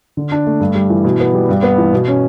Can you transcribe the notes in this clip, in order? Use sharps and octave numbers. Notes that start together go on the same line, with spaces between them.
D3
D4
A3
G2
G3
E3
B2
B3
G3
G2
B3
E3
B2
C#4